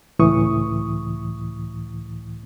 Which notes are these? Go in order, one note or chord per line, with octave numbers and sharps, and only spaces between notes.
C#2 A2 E3 C#6 D#6